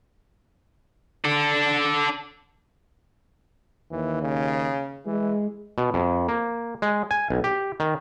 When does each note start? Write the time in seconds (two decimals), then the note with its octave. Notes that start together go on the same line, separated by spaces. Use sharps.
1.25 D4 A4
3.92 D#2 E3
4.23 C#3
5.06 E3 G#3
5.78 B2
5.94 F2
6.28 A#3
6.82 G#3
7.11 G#5
7.30 B1
7.44 G4
7.80 D#3